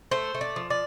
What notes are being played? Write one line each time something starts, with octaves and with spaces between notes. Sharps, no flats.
A3 C5
A3
D5
F3
D5